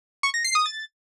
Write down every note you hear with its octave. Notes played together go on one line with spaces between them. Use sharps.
C#6
A#6
C7
D#6
A6